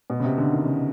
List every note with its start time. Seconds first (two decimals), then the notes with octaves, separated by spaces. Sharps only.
0.10 B2
0.20 C#3
0.24 C3
0.38 D3
0.52 D#3
0.66 C#3